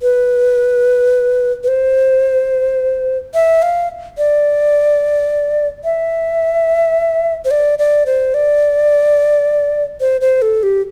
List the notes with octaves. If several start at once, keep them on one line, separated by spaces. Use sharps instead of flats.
B4
B4
C5
E5
F5
D5
E5
C5
D5
D5
C5
D5
C5
C5
A4
G4